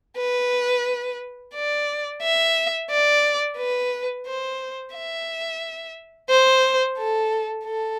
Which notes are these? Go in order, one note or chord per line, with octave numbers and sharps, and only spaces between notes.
B4
D5
E5
D5
B4
C5
E5
C5
A4
A4